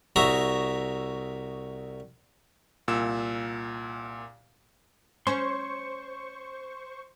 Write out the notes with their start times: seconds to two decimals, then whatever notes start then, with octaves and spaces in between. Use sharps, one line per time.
0.16 C2 F#4 C#5 E5 A#5 D#6
2.88 C2 A#2 E6 E7
5.27 C#4 C5 C#5 C6 C#6